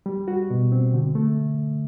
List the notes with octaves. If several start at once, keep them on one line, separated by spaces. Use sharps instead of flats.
G3
F#4
B2
C4
D3
A3